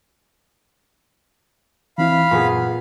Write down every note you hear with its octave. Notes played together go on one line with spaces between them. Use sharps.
E3 C4 E4 F5 B5
F#2 A#2 B3 G#4 F#5